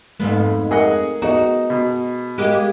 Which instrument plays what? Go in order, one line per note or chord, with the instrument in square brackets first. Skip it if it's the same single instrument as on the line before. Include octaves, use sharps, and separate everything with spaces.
[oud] F2 G#2 B3 [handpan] G#3 A3
[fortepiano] G#4 D#5 F#5 [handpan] A#4
[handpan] B3 G#4 D#5 [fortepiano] D#4 [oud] F#4
[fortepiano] B2
[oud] G#3 A#3 G4